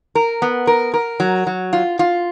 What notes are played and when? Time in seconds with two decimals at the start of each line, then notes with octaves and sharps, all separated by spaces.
0.15 A#4
0.42 B3
0.67 A#4
0.94 A#4
1.20 F#3
1.47 F#3
1.73 F4
1.99 F4